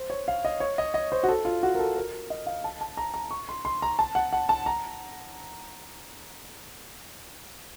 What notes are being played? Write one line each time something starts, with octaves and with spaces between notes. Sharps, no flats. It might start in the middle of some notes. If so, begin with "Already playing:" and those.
Already playing: C5
C#5
F5
D#5
C#5
D#5
D#5
C5
F#4
A4
F4
F#4
A#4
A4
A#4
D#5
F5
A5
A5
A#5
A#5
C#6
C6
C6
A#5
A5
F#5
F#5
A5
A#5